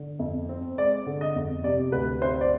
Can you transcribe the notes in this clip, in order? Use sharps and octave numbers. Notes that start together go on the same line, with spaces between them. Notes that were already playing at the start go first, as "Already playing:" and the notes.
Already playing: D3
F2
C4
G#3 D5
D3
D#5
F2
C3 D5
D2 B4
C4 C5
D5